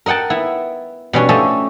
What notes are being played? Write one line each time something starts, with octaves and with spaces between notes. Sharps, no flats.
A#4 D#5 F#5 G5 A5
B3 E4
B2 G3 C#4 D4
F3 A3 C#4 G4 A4 D#5